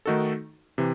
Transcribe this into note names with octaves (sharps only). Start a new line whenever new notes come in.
D#3 A3 D#4 F#4 A4
C3 E3